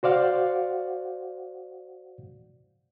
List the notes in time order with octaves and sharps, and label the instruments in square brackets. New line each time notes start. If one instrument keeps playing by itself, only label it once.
[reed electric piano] F#4 C5 D5 F5 F#5